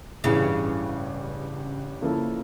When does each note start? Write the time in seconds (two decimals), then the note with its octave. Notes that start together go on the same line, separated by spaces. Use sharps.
0.24 A1 G2 C#3 E3
2.01 C#3 F3 A#3 E4 A4